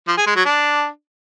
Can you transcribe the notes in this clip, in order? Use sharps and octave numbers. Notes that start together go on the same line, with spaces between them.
F3
G#4
G#3
F#3
D4